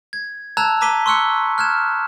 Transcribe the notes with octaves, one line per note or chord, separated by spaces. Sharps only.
G#6
A5 A#5 E6 F#6 G#6
A5 A#5 D6 B6 D#7 G7
C6 C#6 E6 F#6 C#7
F6 F#6 G#6 E7